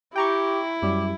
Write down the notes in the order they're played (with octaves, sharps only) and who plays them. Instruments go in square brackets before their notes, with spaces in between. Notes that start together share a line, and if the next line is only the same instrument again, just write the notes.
[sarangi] E4 [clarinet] G4 [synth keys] G5 A#5 C#6
[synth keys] F#2 G3 [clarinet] G4